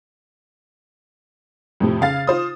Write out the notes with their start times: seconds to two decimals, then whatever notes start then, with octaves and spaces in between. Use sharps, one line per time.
1.80 F2 A2 C3
2.01 C#3 F5 A6
2.27 F4 C5 D#6